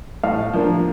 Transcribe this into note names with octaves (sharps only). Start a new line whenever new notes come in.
A2 F5
F3 A#3 D4